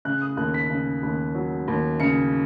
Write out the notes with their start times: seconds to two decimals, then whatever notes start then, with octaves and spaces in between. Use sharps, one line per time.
0.05 C#3 F#6
0.22 D#6
0.37 D#2 F#6
0.54 B6
0.70 C#3
1.03 D#2
1.35 F#3
1.68 D#2
2.00 C#3 C#7